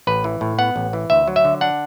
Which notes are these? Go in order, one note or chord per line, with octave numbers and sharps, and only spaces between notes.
A1 B4
E3
A2
B3 F#5
A1
E3
D2 E5
F#3
E5
D3
D4 F#5